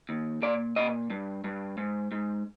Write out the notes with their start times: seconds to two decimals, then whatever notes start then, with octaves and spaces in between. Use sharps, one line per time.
0.09 D#2
0.42 A#2 D5
0.76 A#2 D#5
1.10 G2
1.44 G2
1.78 G#2
2.12 G#2